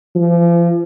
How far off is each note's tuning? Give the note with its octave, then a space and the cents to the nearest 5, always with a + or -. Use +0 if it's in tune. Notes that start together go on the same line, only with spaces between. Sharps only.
F3 -40